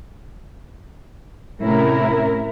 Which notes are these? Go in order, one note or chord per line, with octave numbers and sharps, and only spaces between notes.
A2 C3 C#4 E4 A#4